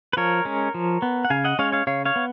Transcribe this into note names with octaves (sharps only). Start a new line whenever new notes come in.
B4
F3 A#4 C#5
G#3 C#4
F3
B3
F#5
C#3 F5 G#5
D#5 F#5
G#3 C#4 C#5 F5
C#5 F5
C#3 C#5 F5
C#5 F5
B3